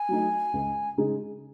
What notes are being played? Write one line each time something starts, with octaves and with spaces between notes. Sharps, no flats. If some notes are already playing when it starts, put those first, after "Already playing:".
Already playing: G#5
F#3 A3 D#4
C#2
C#3 G#3 D#4 G#4